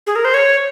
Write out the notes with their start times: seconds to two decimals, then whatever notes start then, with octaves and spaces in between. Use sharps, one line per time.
0.07 G#4
0.16 A#4
0.25 C5
0.34 C#5